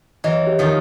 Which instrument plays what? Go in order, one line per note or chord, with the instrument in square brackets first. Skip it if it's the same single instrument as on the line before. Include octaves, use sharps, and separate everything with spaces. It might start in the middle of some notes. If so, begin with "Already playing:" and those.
[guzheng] E3 F#3 [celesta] D#5
[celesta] G4
[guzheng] D#3 F3